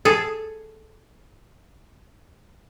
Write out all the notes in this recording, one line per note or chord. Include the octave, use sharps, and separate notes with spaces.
G#4 A4